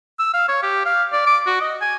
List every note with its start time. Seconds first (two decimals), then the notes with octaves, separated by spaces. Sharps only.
0.19 E6
0.34 F5
0.48 C#5
0.63 G4
0.85 F5
1.13 D5
1.26 D6
1.46 F#4
1.61 D#5
1.81 G#5